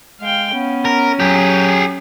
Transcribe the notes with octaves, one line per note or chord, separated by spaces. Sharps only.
G#3 F5 G5
B3 C#4
A#4
F#3 G4 G#4